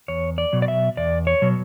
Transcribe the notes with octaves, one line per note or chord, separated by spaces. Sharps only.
E2 C#5
D5
B2 F#3
D5
E5
E2 D5
C#5
B2 F#3